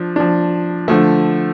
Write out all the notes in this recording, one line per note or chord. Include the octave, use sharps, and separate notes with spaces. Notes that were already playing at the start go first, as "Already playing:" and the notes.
Already playing: F3 D4
F3 D4
D3 F3 A3